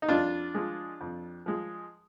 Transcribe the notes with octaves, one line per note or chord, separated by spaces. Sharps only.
D#4
F2 D4 F4
F3 G#3
F2
F3 G#3